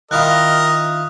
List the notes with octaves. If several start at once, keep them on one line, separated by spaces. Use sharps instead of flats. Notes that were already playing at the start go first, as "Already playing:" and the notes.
D#3 E4 F4 A#4 D#5 D#6 F#6